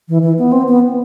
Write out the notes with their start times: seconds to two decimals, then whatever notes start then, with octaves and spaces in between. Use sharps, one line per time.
0.09 E3
0.22 E3
0.38 B3
0.52 C4
0.68 B3